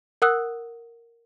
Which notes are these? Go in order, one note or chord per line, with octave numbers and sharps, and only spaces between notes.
A#4 F#5 D#6 E6 F#6